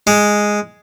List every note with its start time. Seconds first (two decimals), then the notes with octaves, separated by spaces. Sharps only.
0.07 G#3